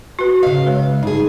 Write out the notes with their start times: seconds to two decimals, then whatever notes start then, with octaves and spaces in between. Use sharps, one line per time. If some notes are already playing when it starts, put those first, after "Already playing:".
0.19 F#4 B4
0.43 C#3 D#5 F5
0.66 G#3 B4 C#5
1.03 G2 D#4 G#4